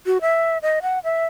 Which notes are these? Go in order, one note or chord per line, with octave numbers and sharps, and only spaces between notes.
F#4
E5
D#5
F#5
E5